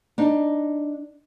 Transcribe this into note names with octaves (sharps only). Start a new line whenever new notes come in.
D4 D#4